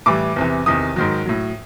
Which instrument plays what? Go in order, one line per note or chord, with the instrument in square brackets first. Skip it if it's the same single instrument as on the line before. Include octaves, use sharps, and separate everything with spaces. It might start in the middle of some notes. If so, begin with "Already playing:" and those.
[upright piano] A2 E3 G3 D6
E2 C3 E3
E2 C3 D#3 D#6
G#2 D#3 F#3
A2 F#3